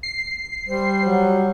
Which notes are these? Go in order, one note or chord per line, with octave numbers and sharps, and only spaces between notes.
C7
G3 C5
F#3